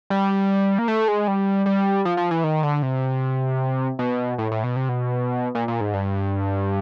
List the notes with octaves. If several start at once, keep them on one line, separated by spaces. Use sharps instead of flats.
G3
A#3
A3
G#3
G3
G3
F3
F3
E3
D#3
D3
C3
B2
A2
A2
B2
C3
B2
A#2
A#2
G#2
G2